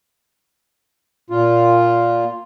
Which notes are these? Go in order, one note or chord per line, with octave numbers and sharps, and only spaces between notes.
A#2 F4